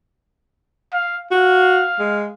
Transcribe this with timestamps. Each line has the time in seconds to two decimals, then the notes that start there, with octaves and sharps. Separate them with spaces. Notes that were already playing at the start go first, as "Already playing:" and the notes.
0.93 F5
1.31 F#4 F5
1.99 G#3